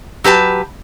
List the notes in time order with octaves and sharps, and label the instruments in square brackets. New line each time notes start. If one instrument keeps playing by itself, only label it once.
[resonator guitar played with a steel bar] F#3 G4 B4 A5